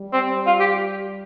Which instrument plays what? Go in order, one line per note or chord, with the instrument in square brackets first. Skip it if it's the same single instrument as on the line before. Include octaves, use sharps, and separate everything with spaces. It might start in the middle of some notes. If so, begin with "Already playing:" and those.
Already playing: [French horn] G3
[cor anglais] C4
F4
G4